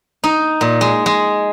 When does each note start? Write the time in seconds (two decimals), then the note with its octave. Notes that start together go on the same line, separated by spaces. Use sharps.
0.24 D#4
0.61 A#2
0.81 G#3
1.06 G#3